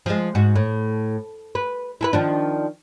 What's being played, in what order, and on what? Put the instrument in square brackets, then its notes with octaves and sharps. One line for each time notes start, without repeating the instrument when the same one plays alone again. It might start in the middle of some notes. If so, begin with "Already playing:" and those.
[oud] F3 G#3
G#2 F#4
A2
B4
E4 A4 B4
D#3 F3 D4